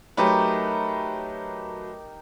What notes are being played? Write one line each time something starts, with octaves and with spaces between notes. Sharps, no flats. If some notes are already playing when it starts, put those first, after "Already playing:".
F#3 A3 D#4 G4 A#4 B4